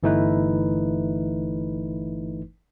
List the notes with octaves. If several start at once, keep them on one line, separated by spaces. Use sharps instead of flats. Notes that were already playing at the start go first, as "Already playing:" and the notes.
G1 E3 A3 D#4 E4 B4